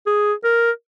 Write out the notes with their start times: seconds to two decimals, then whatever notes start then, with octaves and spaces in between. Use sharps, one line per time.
0.06 G#4
0.44 A#4